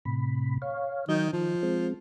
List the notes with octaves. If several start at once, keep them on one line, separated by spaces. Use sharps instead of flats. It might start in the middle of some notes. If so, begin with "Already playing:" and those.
A2 C3 B5
C#5 F5
D#3 F#3 D#5 G6
D#3 F3
G#3 C4